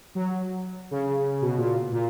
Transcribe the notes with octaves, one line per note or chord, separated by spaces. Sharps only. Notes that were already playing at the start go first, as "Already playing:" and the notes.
F#3
C#3
B2
A#2
A#2